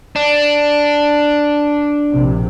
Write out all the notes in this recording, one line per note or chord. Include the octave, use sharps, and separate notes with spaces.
D4
A#1 C3